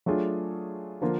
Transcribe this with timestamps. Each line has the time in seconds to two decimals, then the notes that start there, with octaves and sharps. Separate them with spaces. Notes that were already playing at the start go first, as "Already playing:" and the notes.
0.06 F#3 A3 D4 F4 G#4
1.01 D3 F3 A#3 D4 F4